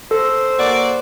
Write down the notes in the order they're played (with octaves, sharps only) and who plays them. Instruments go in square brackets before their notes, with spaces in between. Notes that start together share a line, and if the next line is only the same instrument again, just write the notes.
[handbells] A4 [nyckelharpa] C5
[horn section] A#3 F#4 D5